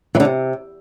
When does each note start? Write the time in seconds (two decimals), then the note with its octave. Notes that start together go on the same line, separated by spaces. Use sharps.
0.15 E3
0.20 D3
0.25 C3